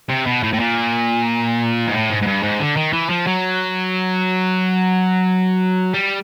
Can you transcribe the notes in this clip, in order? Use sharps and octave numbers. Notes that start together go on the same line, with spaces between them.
C3
B2
A2
A2
A#2
G#2
A2
G#2
G#2
G2
G#2
D3
D#3
E3
F3
F#3
G3